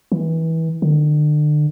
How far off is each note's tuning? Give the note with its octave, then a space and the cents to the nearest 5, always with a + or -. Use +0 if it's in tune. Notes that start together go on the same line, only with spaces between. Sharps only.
E3 -25
D3 +35